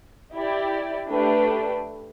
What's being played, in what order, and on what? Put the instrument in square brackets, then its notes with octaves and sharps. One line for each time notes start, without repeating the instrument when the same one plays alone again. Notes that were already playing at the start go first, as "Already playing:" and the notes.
[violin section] E4 G4 D5
A3 D4 G4 B4